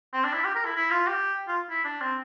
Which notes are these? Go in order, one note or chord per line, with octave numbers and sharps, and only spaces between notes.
C4
D4
E4
G4
A#4
E4
E4
F4
G4
F4
E4
D4
C4